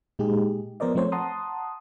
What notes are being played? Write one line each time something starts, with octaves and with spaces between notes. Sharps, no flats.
A#2 G#3 D#4 G4 G#4
F3 B3 A#4 C5 D5 D#5
F3 A3 C4 C5 C#5
F#5 A5 A#5 C6 D#6